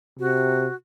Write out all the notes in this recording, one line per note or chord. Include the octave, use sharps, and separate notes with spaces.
C3 F#4